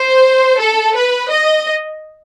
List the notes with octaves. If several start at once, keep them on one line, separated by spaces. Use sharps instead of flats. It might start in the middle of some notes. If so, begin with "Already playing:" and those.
Already playing: C5
A4
B4
D#5